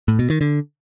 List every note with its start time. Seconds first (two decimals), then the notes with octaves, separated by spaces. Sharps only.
0.08 A2
0.19 B2
0.30 D#3
0.41 D3